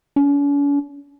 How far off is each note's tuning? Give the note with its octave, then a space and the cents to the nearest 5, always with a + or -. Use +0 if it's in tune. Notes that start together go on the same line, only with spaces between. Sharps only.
C#4 +45